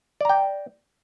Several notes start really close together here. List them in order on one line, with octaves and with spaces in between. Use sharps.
D5 A#5 G5